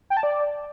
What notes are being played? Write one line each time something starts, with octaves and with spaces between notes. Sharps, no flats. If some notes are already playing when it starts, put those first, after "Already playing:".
G5
A5
D5